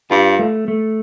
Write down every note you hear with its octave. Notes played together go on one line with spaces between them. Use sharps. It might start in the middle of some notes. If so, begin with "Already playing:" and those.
G2 F4
A3
A3